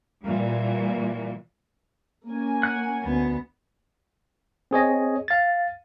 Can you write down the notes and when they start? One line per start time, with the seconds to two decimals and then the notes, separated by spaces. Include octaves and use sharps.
0.25 A#2 E3 G3
2.27 A#3 C#4 G#5
2.63 F#5 F#6
3.04 D2 B3
4.71 C4 G#4 C#5 D#5
5.28 F5 A6